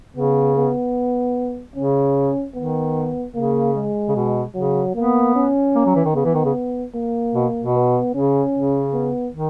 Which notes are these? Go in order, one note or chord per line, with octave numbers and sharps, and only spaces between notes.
C#3 B3
B3
C#3 C#4
D#3 B3
C#3 A#3
G#3
C#3
B2
C#3 F#3
A#3 B3
C#4
A#3
F#3
E3
D#3
C#3 B3
E3
D#3
C#3
A#3
B2
B2
B3
C#3 C#4
C#3
B3
D#3